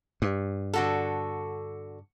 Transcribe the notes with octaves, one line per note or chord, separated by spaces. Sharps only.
G2
D3 F#4 A4